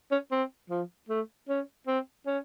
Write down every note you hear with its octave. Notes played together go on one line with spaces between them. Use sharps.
C#4
C4
F3
A3
C#4
C4
C#4